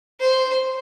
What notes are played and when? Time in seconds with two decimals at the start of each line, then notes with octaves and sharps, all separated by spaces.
0.20 C5